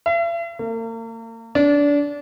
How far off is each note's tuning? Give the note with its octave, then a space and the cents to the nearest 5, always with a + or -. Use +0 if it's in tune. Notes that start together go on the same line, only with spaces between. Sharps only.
E5 +45
A#3 -40
D4 -25